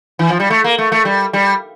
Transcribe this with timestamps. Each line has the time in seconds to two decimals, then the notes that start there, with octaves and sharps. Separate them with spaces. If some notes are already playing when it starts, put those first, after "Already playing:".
0.19 E3
0.30 F3
0.40 G3
0.50 A3
0.64 A#3
0.78 A3
0.92 A3
1.05 G3
1.33 G3